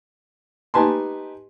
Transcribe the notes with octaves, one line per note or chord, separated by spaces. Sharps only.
D#4 G4 B4 G#5 A5 C6